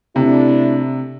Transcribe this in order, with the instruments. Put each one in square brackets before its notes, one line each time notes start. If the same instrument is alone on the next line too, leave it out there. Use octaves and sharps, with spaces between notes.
[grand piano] C3 [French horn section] A3 D4 E4